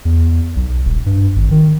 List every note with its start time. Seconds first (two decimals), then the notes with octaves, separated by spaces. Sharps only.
0.05 E2
0.56 B1
0.85 D#1
1.06 G2
1.36 G#1
1.51 D#3